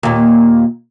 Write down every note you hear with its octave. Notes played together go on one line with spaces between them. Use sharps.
D#2 A#2